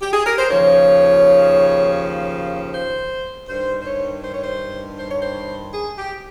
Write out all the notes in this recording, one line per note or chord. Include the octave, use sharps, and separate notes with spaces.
G4
G#4
A#4
C5
D#2 C#3 F3 C#5
C5
G2 D#3 C5
C5
C#5
C5
C#5
C5
C5
C#5
C5
G#4
G4